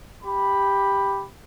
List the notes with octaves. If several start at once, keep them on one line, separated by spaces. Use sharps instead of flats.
G4 B5